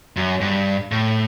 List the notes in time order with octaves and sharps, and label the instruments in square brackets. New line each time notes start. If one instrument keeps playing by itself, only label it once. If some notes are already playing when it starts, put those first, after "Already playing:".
[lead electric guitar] F#2
G2
A2